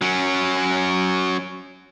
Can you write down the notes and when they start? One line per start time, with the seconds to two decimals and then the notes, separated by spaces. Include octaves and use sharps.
0.01 F#3 C#4